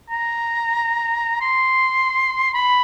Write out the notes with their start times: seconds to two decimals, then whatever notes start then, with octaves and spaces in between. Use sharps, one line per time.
0.10 A#5
1.41 C6
2.54 B5